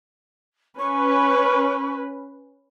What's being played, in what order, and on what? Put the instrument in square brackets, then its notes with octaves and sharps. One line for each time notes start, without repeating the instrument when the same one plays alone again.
[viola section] C#4 B4 [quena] C#6